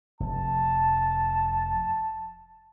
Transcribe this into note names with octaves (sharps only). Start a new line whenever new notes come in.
F1 A5